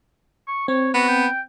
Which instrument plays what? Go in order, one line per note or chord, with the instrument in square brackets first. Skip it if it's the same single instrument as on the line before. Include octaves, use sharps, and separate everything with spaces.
[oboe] C#6
[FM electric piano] C4 [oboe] C#5
[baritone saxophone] B3 [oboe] F#4
[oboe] G5